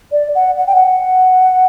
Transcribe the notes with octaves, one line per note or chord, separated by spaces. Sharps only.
D5
F#5
F#5
G5
F#5